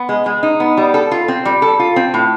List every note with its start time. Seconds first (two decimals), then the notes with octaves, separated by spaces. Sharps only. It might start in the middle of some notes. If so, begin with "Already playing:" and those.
Already playing: B3
0.09 G#3
0.26 G#3
0.43 D#4
0.60 B3
0.77 G3
0.94 A4
1.11 F4
1.28 C4
1.45 G3
1.62 A4
1.79 F4
1.96 C4
2.14 A2